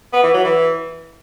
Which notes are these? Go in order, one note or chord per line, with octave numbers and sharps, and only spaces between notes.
B3
E3
F#3
E3